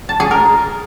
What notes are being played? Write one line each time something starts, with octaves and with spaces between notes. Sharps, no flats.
A5
G#4
A#4